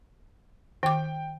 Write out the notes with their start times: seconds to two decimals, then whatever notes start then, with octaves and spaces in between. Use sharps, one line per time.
0.83 D#3 G5 D6